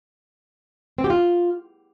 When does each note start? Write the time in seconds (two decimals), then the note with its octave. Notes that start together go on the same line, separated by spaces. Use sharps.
0.98 C4
1.04 G4
1.10 F4